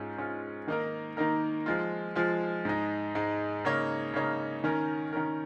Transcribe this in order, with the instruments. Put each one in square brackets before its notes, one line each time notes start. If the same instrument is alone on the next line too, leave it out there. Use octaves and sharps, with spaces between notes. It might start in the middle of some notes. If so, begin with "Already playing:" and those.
Already playing: [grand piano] G#2 G#3 C#4 F4
G#2 G#3 C#4 F4
D#3 A#3 D#4 A#4
D#3 A#3 D#4 A#4
F3 G#3 F4
F3 G#3 F4
G#2 G#3 D#4
G#2 G#3 D#4
C#3 A#3 D#4 C#5
C#3 A#3 D#4 C#5
D#3 C#4 A#4
D#3 C#4 A#4